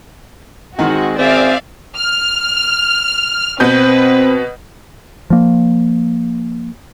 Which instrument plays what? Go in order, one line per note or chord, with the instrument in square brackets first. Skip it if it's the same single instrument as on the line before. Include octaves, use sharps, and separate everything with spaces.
[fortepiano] D#3 [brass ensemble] G#3 C4 [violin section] F#4
[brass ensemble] G#1 C#4 G#4 [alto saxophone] C4 [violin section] D5 E5 F5
[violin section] F6
[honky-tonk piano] B2 B3 G6 [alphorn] C4 [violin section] B4
[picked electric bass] F3 A#3